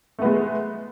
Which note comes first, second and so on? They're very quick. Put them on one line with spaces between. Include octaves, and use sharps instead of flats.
A3 B3 G#3